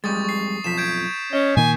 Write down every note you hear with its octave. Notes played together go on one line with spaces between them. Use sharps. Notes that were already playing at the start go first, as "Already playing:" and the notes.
F2 G3 G#3 C#6 D#6 A6
C#6 C7
B1 F2 F3 B6 E7
G6 G#6 D7
C#4 D#5
A#2 D#3 A#3 G#5